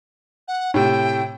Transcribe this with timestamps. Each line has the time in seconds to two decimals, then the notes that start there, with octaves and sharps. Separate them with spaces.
0.48 F#5
0.74 A2 C3 G5